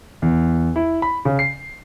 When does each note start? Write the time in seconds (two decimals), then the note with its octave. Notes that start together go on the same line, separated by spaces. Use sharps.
0.22 E2
0.76 E4
1.02 B5
1.25 C#3
1.39 C7